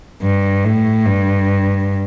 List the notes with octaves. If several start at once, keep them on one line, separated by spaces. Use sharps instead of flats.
G2
A2
G2